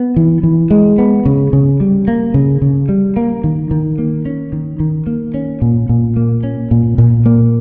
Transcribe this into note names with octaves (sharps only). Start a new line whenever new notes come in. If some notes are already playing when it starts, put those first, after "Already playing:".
Already playing: B3
E3
E3
G#3
B3
C#3
C#3
G3
A#3
C#3
C#3
G3
A#3
D#3
D#3
A#3
C#4
D#3
D#3
A#3
C#4
A#2
A#2
A#3
C#4
A#2
A#2
A#3